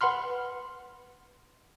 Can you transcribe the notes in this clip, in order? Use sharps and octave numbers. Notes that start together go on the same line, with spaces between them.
B4 F#5 B5 C6 F6